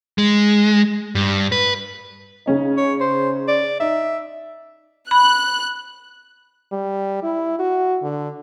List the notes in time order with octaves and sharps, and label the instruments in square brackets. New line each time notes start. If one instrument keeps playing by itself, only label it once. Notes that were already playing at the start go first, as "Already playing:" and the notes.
[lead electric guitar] G#3
G2
B4
[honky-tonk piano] C#3 C#4 D#4
[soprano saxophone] C#5
C5
D5
[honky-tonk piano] D#4 [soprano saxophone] E5
[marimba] B5 [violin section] F#6
[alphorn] G3
E4
F#4
D3